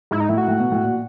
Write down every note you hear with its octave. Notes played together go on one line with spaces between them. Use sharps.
G#2 E4
D#4
A2 E4
F#4
A2
B2
A2
A#2